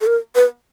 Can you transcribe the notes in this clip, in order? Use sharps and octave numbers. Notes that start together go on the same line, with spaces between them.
A4
A#4
B4